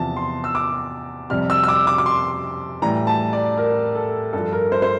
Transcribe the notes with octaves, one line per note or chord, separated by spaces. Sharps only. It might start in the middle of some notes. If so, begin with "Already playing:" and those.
Already playing: E2 C3 F3 A5
C6
E6
D6
F2 C3 G3 F6
E6
E6
D6
D6
D6
C6
A2 E3 G3 A#5
A5
D5
A#4
A4
G2 F3 A4
A#4
C5
C5